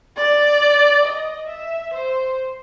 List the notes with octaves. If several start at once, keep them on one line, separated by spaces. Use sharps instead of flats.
D5
D#5
E5
C5